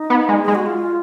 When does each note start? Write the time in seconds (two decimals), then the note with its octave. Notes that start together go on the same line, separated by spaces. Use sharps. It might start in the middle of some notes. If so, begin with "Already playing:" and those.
Already playing: D#4
0.10 B3
0.29 G#3
0.43 G#4
0.48 G#3
0.55 F#4
0.66 F4